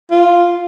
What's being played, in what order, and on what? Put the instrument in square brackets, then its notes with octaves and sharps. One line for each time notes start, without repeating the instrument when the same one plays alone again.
[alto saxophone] F4